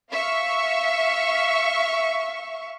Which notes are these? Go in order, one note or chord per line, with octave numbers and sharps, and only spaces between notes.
E5 F5 C#6